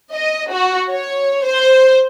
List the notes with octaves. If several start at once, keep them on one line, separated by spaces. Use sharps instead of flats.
D#5
F#4
C#5
C5